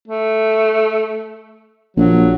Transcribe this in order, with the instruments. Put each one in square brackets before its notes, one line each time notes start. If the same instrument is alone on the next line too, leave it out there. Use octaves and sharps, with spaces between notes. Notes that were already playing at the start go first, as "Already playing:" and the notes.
[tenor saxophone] A3
[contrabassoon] A#1 [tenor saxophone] F#3